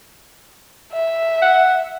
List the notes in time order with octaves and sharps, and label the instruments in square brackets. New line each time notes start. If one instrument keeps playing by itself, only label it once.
[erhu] E5
[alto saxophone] F#5